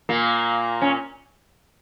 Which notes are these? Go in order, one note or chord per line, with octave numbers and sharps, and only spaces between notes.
A#2 A#3
C#4